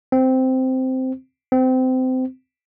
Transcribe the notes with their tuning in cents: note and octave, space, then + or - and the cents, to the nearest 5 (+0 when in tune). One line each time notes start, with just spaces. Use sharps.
C4 -10
C4 -25